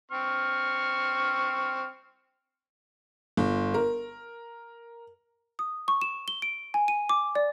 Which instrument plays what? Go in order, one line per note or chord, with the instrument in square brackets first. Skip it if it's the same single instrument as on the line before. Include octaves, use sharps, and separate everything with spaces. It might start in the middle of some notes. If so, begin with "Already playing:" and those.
[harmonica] C4 C#6 F6
[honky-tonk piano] G1
A#4
[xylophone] D#6
C#6
E7
G7
D7
G#5
D#7
D6
D5